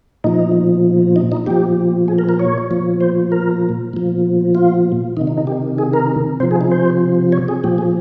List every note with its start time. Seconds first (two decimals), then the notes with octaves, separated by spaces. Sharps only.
0.24 A#2 F3 D#4
1.16 D#4
1.32 D#4
1.46 A#2 F3 G4
2.08 G#4
2.18 A#4
2.29 A#4
2.39 C#5
2.71 A#2 F3
3.01 C5
3.32 A#4
3.93 A#2 F3
4.55 F4
5.17 D#3 D#4
5.21 C3
5.27 D#4
5.37 D#4
5.47 G4
5.78 G#4
5.93 A#4
6.40 C3 F3 C5
6.51 G#4
6.61 D#4
6.72 C5
7.32 C#5
7.48 G#4
7.64 A#2 F3 G4
7.78 G#4